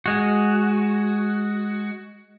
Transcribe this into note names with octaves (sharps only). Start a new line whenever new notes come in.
G#3 F#4